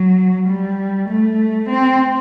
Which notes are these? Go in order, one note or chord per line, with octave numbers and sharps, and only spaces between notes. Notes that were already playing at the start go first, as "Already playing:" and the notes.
Already playing: F#3
G3
A3
C4